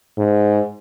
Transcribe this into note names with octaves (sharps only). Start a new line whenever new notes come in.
G#2